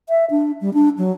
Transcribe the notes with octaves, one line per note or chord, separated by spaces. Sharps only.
E5
D4
G3
D4
F#3